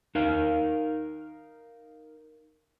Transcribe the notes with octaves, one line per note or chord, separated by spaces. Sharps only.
D#4 A#4 F5